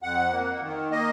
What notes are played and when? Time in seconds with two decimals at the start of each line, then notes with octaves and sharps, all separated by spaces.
0.03 F2 F#5
0.32 A#3
0.61 D#3
0.91 A#3 D#5